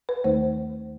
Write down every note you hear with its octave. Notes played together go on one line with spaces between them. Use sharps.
B4
D#2 D#3 A3 D#4 C5